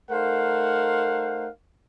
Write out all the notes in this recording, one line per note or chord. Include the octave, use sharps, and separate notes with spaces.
A3 D#4 A#4 C5 F5 F#5